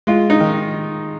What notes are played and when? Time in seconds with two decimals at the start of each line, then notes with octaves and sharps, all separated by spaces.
0.07 G#3 F4
0.30 D#4
0.40 D#3